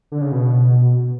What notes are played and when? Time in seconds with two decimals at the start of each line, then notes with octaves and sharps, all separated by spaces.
0.12 D3
0.21 C#3
0.32 B2